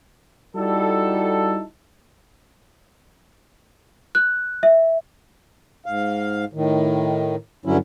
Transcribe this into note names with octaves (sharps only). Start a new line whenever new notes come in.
G3 D#4 E4 F#4 A4
F#6
E5
G#2 F5
A2 D#3
G2 D3 F#3 C#4 E4